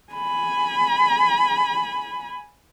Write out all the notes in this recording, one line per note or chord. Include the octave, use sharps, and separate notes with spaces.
G#5 B5